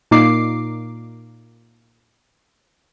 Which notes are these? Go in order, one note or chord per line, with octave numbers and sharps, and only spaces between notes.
A#2 A#3 D#4 D6 C7